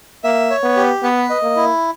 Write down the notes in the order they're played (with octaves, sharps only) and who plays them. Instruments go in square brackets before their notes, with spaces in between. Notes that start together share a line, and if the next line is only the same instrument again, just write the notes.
[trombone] A#3 [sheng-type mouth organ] E5
[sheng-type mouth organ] C#5
[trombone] B3
[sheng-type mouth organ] G4
[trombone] B3 [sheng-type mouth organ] B4
[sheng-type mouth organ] D#5
[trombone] A#3
[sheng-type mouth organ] E4